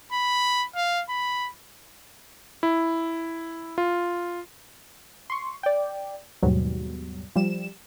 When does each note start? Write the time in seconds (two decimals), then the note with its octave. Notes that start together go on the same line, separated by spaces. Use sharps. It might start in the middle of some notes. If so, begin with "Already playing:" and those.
0.12 B5
0.75 F5
1.09 B5
2.63 E4
3.78 F4
5.30 C6 C#6
5.63 D5 G5
6.42 D#2 G#2 B2 F#3 G3
7.36 F3 G3 E7